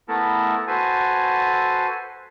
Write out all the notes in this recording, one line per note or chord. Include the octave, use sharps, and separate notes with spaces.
A3 B3 E4 A4 A#4
F#4 A4 B4 C5 G#5